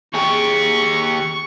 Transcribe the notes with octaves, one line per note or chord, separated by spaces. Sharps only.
D#2 G4 G#4 C#6